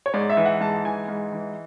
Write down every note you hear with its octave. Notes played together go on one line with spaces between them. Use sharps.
C#5
G#2 D5
E5
E3
F#5
G#2 A5
E3 G#5
G#2
E3